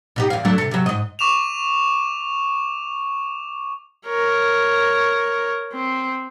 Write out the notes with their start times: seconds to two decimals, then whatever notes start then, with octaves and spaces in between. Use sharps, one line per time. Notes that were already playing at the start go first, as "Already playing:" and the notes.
0.16 B2 D#4 G4
0.30 E2 F5
0.45 F#3 A3 D4
0.58 C3 A4
0.71 C3 F#3
0.86 G#2 D#5
1.19 C#6 D6 E7 F7
4.08 A#4 C#5
5.73 C4